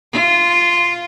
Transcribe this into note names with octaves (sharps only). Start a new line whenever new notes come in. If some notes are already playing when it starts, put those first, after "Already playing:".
F4